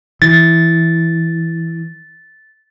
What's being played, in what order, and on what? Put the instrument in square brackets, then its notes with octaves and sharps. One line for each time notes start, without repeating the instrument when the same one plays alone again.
[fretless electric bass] E3 [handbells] A6